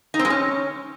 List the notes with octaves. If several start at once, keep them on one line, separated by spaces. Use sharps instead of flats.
D#4
C4
G#3
C#4